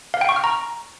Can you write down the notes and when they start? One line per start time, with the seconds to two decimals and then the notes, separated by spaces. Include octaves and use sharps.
0.14 F5
0.21 G5
0.29 C#6
0.36 F6
0.44 A#5